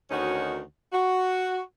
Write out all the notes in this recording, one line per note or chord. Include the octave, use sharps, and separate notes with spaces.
D2 D#3 C#4 D#4 F#4
F#4